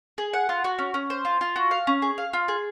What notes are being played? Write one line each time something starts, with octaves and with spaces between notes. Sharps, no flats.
G#4
F#5
F4
F#4
C#4
C#4
C5
F4
F4
F#4
F5
C#4
G#4
F5
F4
G#4